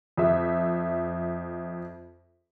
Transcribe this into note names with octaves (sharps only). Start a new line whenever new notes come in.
F2 E5